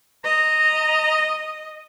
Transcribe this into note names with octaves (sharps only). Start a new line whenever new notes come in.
D#5 A#5